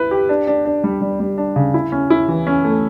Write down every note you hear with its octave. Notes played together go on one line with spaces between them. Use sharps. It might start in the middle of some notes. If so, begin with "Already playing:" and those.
Already playing: E4 B4
G4
D4
D4
D4
G3
G3
G3
D4
C#3
E4
C#4
E4
E3
C#4
A3